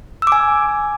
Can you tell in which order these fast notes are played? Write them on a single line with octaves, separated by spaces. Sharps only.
E6 D6 G#5